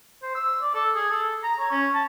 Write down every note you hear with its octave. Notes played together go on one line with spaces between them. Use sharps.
C5
E6
D5
A4
G#4
A4
A#5
C#5
C#4
A5